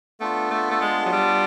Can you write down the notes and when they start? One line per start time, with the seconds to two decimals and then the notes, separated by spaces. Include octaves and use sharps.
0.20 A3 B3 D4 F4
0.51 A3
0.71 A3
0.81 G#3
1.05 F#3
1.12 G3